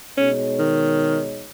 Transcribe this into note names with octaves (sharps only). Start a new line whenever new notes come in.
B2 G#3 C#4 D#4 G#4 C#5
D#3